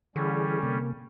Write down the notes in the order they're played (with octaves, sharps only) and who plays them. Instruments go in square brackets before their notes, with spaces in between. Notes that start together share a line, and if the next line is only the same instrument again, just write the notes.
[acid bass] D3 [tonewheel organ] E3 G#4 [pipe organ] G3 C#4
[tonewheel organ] C3 A#3